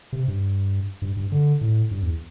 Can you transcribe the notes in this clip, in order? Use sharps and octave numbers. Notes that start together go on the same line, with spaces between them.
C3
G2
G2
G2
D3
A2
G2
E2